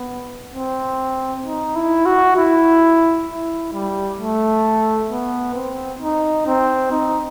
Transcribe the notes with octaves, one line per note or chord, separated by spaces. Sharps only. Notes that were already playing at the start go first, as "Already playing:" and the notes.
Already playing: B3
C4
D#4
E4
F#4
E4
E4
G3
A3
B3
C4
D#4
C4
D#4